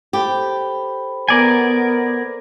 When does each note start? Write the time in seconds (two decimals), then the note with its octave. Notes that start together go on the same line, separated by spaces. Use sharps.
0.13 G4 A4 C5 B5
1.28 B3 A#4 D5 G#5